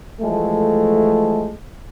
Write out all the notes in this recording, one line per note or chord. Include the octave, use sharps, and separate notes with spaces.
E3 F3 G#3 A3